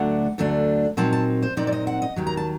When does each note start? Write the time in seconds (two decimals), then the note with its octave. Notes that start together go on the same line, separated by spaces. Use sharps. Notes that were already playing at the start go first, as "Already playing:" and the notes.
Already playing: D2 D3 F#3 A3 D4 F#5
0.38 D2 D3 F#3 A3 D4
0.97 A#2 F#3 C4 D#4 A5
1.13 A5
1.42 C5
1.57 A#2 F#3 C4 D#4 D5
1.67 D5
1.72 D#5
1.87 F#5
2.02 D#5
2.16 D#2 D#3 F#3
2.27 A#5
2.37 A5